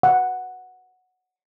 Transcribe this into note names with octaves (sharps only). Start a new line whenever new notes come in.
F#5